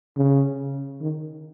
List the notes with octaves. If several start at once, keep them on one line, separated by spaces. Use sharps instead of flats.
C#3
D#3